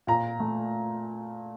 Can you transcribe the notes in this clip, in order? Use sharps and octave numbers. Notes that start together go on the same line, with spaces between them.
A#2 A#5
A3